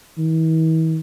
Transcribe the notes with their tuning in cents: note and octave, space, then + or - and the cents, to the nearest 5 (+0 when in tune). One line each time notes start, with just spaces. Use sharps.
E3 -40